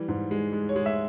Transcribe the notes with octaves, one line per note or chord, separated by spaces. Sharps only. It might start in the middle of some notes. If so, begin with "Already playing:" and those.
Already playing: E3 G3
G#2
G#3
G#3
C#5
G#3
E5